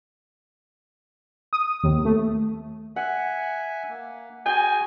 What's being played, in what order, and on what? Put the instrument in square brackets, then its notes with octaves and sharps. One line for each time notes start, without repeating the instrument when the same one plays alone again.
[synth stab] D#6
D#2
A3
[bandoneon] E5 G#5 [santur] F#5
[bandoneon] A#3
[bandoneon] F#4 G#4 [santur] G5 [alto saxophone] G#5